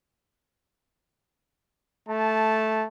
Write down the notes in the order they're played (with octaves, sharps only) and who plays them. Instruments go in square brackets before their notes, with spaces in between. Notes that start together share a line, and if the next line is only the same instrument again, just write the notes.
[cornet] A3 [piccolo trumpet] A5